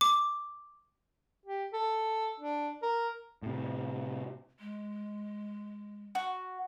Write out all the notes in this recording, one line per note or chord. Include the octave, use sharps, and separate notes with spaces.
D6
G4
A4
D4
A#4
A2 C3
G#3
F#4